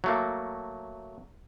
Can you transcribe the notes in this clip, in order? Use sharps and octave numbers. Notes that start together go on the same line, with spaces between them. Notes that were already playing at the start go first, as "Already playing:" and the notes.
F#3 A3 A#3